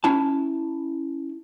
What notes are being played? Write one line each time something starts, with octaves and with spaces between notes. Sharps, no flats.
C#4 E4 A5